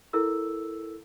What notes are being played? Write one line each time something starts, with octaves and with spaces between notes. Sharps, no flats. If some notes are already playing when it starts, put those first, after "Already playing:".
E4 A4 A#4 E6